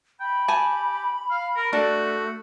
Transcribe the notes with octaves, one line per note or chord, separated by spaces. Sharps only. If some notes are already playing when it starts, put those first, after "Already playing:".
G5 B5
G4 G#5 A5
F5
A#4
A3 D4 F#4 A5